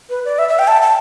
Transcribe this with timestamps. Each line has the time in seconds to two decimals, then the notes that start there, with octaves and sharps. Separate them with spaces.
0.09 B4
0.25 D5
0.38 E5
0.49 E5
0.59 G5
0.67 A5
0.82 A5